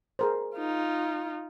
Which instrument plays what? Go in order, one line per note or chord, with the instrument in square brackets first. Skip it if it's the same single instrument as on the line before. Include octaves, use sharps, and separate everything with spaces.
[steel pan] G#4 A#4 C5
[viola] D#4 F4